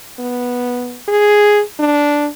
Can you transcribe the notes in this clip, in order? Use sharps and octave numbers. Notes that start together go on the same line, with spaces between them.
B3
G#4
D4